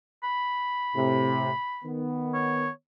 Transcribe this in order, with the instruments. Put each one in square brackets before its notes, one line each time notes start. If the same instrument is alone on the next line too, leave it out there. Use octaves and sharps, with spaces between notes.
[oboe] B5
[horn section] A2 C3
D#3 B3
[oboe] C#5